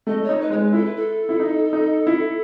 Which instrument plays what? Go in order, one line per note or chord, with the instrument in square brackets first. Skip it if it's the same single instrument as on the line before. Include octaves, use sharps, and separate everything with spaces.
[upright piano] A3 [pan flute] D#5
[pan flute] C#5
[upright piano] D#4
[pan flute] B4
[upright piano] G#3 [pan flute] C#5
[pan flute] B4
[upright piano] E4 [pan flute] A4
[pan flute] B4
A4
[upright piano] E4
D#4
D#4
E4